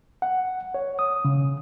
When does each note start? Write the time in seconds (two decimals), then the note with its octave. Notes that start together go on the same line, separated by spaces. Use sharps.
0.22 F#5
0.74 C#5
0.99 D#6
1.25 C#3